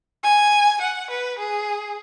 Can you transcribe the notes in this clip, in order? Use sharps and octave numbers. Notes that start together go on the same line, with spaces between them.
G#5
F#5
B4
G#4